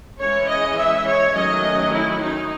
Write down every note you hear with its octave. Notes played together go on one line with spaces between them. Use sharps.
E3 G#3 C#4 C#5
D#5
E5
C#5
D#3 F#3 A3 C#4 D#5
E4
D#4